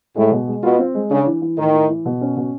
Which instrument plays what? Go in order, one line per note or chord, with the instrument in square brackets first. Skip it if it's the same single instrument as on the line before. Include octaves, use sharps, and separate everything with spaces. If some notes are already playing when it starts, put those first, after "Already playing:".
[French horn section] A2 [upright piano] G#3
[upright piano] B2
G#3
[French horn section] B2 [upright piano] F4
[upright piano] C4
G#3
[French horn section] C#3 [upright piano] D4
[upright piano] E3
E3
[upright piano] A2 [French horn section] D#3
[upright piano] A2
E3
B2
C#4
B2